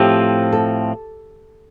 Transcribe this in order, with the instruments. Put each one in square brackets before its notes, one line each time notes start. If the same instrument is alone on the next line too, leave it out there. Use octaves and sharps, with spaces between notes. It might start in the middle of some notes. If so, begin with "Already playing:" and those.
Already playing: [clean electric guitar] A2 F3 C4 [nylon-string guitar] G4
[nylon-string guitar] A4